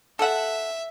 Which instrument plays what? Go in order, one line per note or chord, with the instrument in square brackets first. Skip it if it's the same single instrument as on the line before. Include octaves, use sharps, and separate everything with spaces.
[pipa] A4 F#5 [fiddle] E5